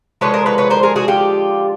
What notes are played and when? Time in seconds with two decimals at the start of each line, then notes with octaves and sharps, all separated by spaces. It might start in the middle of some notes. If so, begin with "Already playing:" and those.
0.21 D3 F3 G#3 B4 C#5
0.34 A#4 C5
0.46 B4 C#5
0.58 B4 C#5
0.70 A#4 C5
0.83 G#4 A#4
0.96 F#4 G#4
1.08 F4 G4